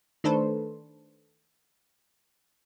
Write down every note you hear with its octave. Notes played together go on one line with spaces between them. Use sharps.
D#3 A3 D4 A4 B4 C5